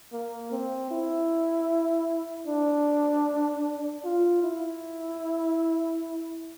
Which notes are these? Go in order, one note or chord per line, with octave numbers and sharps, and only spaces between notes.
A#3
C4
E4
D4
F4
E4